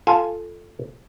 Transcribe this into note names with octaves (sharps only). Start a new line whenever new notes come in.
F4 A4 G#5